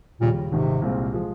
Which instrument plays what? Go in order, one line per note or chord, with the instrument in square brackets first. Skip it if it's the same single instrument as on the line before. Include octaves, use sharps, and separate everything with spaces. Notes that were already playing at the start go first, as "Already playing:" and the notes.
[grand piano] D#2 C#3 G3 [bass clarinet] A#2
[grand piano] G#1 G#2 D#3 [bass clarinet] C3
[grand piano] C2 A#2 G#3 C4 F4
F3 G#3